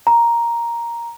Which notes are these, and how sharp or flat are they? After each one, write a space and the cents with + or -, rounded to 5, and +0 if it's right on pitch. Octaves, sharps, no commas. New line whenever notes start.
A#5 +5